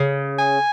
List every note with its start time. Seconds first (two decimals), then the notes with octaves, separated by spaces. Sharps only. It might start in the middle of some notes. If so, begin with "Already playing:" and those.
Already playing: C#3
0.38 G#5